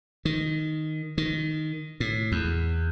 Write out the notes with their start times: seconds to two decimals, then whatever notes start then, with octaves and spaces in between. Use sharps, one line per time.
0.25 D#3
1.18 D#3
2.00 A2
2.32 E2